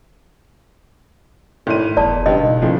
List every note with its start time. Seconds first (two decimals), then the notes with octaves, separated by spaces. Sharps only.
1.67 G#1 A2 D#7
1.97 F1 E2 D5 A5
2.26 C#2 G2 D#5
2.42 B2 D#3
2.62 A2 C#3 F3